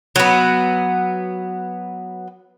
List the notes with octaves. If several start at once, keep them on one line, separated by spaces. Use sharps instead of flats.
F#3 B3